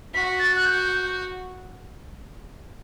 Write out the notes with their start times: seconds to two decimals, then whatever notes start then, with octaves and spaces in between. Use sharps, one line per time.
0.14 F#4 B6
0.39 A6
0.56 F#6
0.66 G6